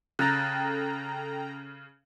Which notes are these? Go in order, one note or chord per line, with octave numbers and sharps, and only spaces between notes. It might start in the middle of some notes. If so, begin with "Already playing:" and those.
C#3 A4 G5 A#5 F#6 A6